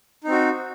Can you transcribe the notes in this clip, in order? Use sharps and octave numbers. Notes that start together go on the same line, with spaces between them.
C4 D#4 F#4